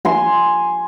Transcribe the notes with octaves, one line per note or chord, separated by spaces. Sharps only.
G#5 C6